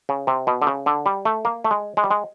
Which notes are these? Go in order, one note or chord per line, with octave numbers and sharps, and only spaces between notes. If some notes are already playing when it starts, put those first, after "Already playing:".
C#3
C3
B2
D3
C#3
D3
G3
A3
A#3
A3
G#3
G#3
G3
G#3